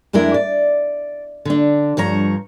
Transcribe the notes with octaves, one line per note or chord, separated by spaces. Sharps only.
F2 G#3 D4 E4 A#4
D5
D3 D4
G2 F3 C#5 A#5